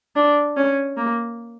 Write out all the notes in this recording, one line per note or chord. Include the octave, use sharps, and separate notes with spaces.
D4
C#4
A#3